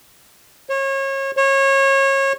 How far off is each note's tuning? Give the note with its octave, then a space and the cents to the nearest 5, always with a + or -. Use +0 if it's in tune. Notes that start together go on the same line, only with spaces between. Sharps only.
C#5 -30
C#5 -25